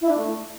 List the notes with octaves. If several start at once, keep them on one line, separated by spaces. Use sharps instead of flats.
E4
D4
A3